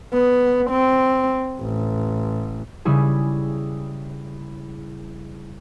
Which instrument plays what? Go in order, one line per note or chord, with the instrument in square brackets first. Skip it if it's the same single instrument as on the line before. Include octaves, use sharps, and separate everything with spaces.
[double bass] B3
C4
A1
[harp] C#3 G3 E4 G#4